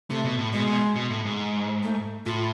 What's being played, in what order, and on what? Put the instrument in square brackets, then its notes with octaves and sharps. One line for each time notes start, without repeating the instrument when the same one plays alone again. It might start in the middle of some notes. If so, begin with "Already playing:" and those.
[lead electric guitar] C3 [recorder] A3
[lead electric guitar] B2
A2
[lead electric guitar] B2 [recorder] G#3
[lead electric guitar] B2
B2
A2
G#2
[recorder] A3
[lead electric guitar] A2 [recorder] F4